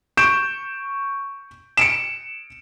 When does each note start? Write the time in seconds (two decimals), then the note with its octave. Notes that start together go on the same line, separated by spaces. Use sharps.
0.17 C#6 G6 D7 E7
1.77 C#7 D7 E7